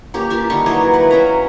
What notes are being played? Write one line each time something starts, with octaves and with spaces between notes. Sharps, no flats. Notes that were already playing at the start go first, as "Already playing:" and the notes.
A#3 C#4 G4
F4 A#4 E5
D3 G3 D#4 C#6
E3 F#3 C#5 D#5
B4 F#5
F#3 C#4 A#5